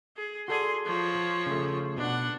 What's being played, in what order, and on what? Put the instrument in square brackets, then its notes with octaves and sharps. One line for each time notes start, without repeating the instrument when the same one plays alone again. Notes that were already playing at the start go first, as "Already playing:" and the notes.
[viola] G#4
[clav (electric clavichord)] F#4 A4 D5 [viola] G#4 C6
[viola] F3 C#5
[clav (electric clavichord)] C#3 A3
[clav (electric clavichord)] B2 [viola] D4 F#5